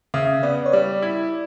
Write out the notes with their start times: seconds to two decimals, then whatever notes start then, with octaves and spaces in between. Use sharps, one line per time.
0.14 C#3 E5
0.43 B3 D5
0.66 C#5
0.72 G3 D5
1.02 E4